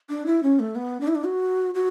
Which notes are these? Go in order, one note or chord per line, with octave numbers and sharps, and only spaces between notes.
D4
E4
C#4
A3
B3
D4
E4
D4
F#4
F#4